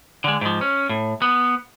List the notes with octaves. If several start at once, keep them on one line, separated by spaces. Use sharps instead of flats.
D3 G#3
G#2 F3
C#4
A2
B3